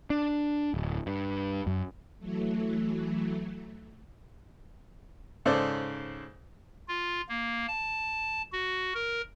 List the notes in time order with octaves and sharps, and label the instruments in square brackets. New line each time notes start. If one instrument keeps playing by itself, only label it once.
[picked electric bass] D4
D1
G2
F#2
[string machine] E3 F#3 A3
[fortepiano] G#2 C#3 A4 C5 D5
[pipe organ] F4
A#3
A5
F#4
A#4